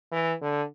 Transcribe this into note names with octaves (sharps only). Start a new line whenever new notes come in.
E3
D3